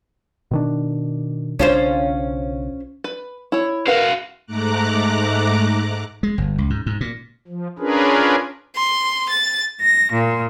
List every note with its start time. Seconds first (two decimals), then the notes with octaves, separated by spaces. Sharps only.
0.51 B2 D#3 D4
1.59 B1 C#3 C#4 D4 F4 C5
3.04 B4
3.52 E4 C#5
3.87 F#4 A#4 B4 F5 F#5
4.46 G#2 A3 A#5 D6 F#6
6.23 G#3
6.38 G1
6.58 C#2
6.70 G#2
6.86 G#2
7.01 A#2
7.48 F3
7.79 C#4 D4 F4 G#4 A#4 B4
8.76 C6
9.29 A6
9.82 A#6
10.13 A#2